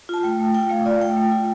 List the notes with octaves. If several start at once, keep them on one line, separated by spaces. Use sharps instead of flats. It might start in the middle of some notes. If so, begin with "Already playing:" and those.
F4 A5
A3 G5
A3
F4 G5
A3 F5
F4 D5
A3 G5
A3
F4